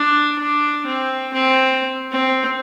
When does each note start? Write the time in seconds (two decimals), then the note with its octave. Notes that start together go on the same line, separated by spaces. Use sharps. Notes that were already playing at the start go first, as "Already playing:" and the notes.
Already playing: D4
0.39 D4
0.86 C4
1.33 C4
2.11 C4